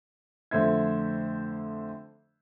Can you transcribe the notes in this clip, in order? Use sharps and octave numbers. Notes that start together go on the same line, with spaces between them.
F2 D3 A3 C5 E5 G#6